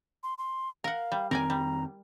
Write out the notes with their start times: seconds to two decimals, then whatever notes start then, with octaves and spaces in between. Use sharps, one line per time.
0.23 C6
0.38 C6
0.84 A#4 F5 F#5
1.12 G3
1.31 F2 D#3 C4 A#4 D5 G#5 A#5
1.50 G3